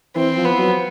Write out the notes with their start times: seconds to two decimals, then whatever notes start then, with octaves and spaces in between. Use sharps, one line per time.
0.16 E3 C4
0.37 F3
0.44 B3
0.58 F#3